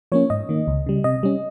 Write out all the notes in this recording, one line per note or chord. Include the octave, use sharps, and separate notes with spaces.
F3 A#3 C#4 C#5
G#2 D#5
D#3 A#3
C#2
C#3 G3
C3 D#5
G3 C#4